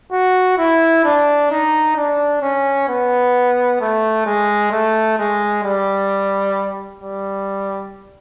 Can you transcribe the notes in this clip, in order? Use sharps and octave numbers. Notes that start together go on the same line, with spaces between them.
F#4
E4
D4
D#4
D4
C#4
B3
A3
G#3
A3
G#3
G3
G3